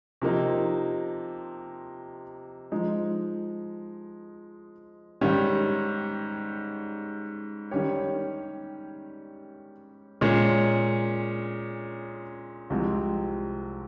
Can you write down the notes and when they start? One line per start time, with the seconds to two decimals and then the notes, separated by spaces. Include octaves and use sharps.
0.22 C3 F3 A#3 D#4
2.72 F3 G#3 D#4
5.21 G#2 D#3 G3 C#4
7.71 D#3 G3 C#4 G4 C#5
10.21 A#2 G#3 C#4 G#4 C#5
12.70 C2 C3 F3 G#3 C4